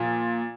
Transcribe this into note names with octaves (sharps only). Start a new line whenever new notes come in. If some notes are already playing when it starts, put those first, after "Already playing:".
Already playing: A#2 F3